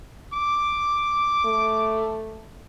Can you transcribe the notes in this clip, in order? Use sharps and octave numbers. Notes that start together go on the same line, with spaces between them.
D6
A3